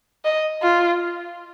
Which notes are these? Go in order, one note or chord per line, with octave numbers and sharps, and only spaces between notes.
D#5
F4